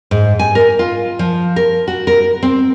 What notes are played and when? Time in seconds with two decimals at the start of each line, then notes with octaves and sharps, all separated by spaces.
0.11 G#2
0.39 G#5
0.55 A#4
0.79 F4
1.19 F3
1.56 A#4
1.88 F#4
2.07 A#4
2.43 C4